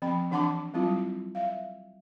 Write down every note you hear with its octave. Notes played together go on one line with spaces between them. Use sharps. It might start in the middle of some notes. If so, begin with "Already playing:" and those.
F3 C4 G5 B5
E3 D4 F#5 A5 C6 D6
F#3 G3 C4 E4 F4
E5 F5